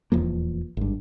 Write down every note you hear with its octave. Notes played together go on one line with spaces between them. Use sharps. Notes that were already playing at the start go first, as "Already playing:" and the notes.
D#1 E2 F3 A#3
G#1 G2